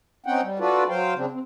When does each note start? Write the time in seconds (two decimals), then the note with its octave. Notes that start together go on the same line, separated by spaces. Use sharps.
0.26 C4 C#4 D#4 F#5 G5
0.42 G3
0.59 D4 F4 F#4 A4 B4 D5
0.89 F#3 C5 F5 G5
1.15 C#3 C4 D4
1.32 C4